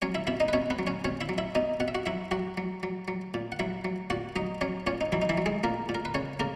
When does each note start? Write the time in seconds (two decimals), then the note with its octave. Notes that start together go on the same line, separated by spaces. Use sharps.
0.02 F#3 C#4 C#5
0.15 E4 E5
0.27 B2 E4 E5
0.40 D#4 D#5
0.48 B4
0.53 B2 C#4 C#5
0.70 B3 B4
0.79 F#3
0.87 C#4 C#5
1.05 B2 C#4 C#5
1.21 E4 E5
1.29 F#3
1.38 E4 E5
1.55 B2 D#4 D#5
1.80 B2 F#5
1.88 E5
1.95 F#4 F#5
2.06 F#3 E4 E5
2.31 F#3 F#4 F#5
2.58 F#3
2.83 F#3
3.08 F#3
3.34 A#2
3.52 F#5
3.59 F#3 E4 E5
3.85 F#3
4.10 A#2 F#4 F#5
4.36 F#3 D#4 D#5
4.61 F#3 C#4 C#5
4.87 A#2 C#4 C#5
5.01 D#4
5.12 E3 F#3 E4
5.22 D#4
5.29 E3 E4
5.38 F#3
5.46 G#3 G#4
5.63 A#2 A#3 A#4
5.89 A#2
5.95 A#4
6.05 B4
6.14 C#3 C#4 C#5
6.40 C#3 A#3 A#4